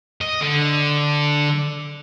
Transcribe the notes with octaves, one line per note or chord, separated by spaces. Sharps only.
D#5
D3